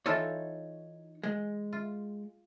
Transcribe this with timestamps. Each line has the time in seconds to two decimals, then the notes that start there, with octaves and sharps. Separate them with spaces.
0.06 E3 D#4 F4 A4 C#5
1.23 G#3
1.73 F4